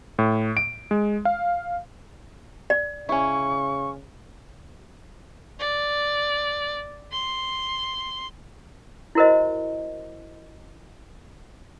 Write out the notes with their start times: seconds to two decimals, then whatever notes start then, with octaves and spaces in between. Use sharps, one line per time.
0.19 A2
0.57 D7
0.91 G#3
1.25 F5
2.70 D5
3.09 C#3 C#4 E4 C#6
5.59 D5
7.12 C6
9.15 E4 F#4 A#4 C5 D#5